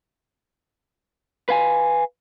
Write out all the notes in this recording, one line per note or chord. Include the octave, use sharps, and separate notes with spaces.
B4 F5 G#5